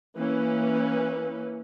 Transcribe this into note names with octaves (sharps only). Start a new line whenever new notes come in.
E3 A#3 C#4 B4